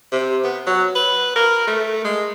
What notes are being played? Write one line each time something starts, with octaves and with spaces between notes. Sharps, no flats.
C3
B3
F#3
B4
A#4
A3
G#3